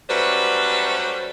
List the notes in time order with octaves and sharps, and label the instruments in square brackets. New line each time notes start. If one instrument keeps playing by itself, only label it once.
[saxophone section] F#3 G3 A3 C#4 B4 C5